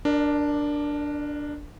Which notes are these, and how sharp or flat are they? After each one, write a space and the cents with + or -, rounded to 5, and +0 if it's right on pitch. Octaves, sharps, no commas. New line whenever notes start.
D4 +0 A#4 +0 D5 +40